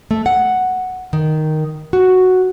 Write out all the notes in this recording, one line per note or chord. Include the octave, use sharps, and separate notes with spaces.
A3
F#5
D#3
F#4